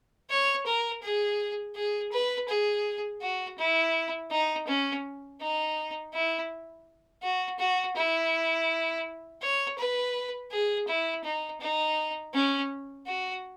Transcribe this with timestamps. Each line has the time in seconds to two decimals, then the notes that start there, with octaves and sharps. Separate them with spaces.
0.30 C#5
0.66 A#4
1.02 G#4
1.76 G#4
2.12 B4
2.48 G#4
3.22 F#4
3.58 E4
4.31 D#4
4.67 C#4
5.41 D#4
6.14 E4
7.23 F#4
7.59 F#4
7.96 E4
9.42 C#5
9.78 B4
10.52 G#4
10.88 E4
11.24 D#4
11.60 D#4
12.34 C#4
13.07 F#4